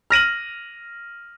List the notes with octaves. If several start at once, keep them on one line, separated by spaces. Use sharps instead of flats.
F6 A#6 D#7 F#7